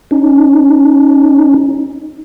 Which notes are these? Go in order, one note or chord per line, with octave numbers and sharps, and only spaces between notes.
C#4 D#4